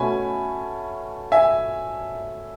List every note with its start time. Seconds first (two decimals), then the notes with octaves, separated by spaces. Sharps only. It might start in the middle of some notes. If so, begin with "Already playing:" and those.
Already playing: B2 A3 C#4 G#5 B5
1.32 E5 G#5